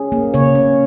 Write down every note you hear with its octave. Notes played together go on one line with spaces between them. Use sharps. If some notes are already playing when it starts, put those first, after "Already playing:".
Already playing: C#4 G#4
A#3
C#3 C#5
C#4